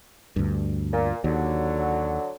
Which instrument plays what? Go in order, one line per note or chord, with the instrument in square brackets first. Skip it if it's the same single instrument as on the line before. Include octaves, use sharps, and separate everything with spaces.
[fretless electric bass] D2 G2
[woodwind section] A#2
[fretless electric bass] D#2 [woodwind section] D3 F#3